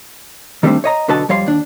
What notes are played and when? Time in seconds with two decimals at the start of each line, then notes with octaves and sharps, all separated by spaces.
0.63 D#3 G3 A3 A#3 C4 D4
0.84 C#5 D#5 A#5
1.08 B1 D3 F#4 B4 D#5 A5
1.29 F2 G3 C#5 F5 C6
1.46 D#2 D4